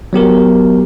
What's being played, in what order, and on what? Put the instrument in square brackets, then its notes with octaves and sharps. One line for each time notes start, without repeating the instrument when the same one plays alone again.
[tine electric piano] F#3 B3 G4 A#4